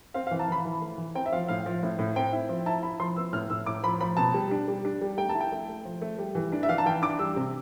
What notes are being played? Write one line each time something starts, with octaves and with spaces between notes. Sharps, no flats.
C4 F5
F5
E3
A5
E3 B5
E3
A3
E3
C4 G5
E5
F3 F5
A2 F5
F3
A2
A2
C4 G5
E4
F3
E4 A5
E4 B5
F3 C6
B3 E6
A2 F6
A2 E6
A2 D6
F3 B5
F3 B5
B2 A5
G3
D4
G3
D4
G3
A3 G5
A5
E4
G5
A3
A3
F3
A3
G3
E3
D4
E5
E3 F5
A5
E3 G5
D4 D6
G3 E6
C3